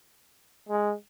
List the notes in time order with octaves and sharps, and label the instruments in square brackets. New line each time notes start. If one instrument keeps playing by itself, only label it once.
[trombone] G#3